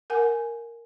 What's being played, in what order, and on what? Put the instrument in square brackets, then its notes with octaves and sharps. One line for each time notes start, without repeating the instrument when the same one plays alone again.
[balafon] A#4 F#5 G#5